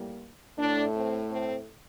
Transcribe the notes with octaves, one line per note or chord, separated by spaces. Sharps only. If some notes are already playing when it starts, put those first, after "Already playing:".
Already playing: A2 G3 A#3
A2 A3 D4
C4
C4